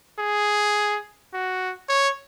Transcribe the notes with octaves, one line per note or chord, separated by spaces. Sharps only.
G#4
F#4
C#5